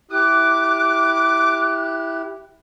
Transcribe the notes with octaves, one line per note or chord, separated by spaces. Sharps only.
E4 G4 D6 F#6